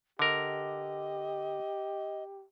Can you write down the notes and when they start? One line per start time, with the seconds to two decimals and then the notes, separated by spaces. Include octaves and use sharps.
0.19 D3 G4 A#4 D#5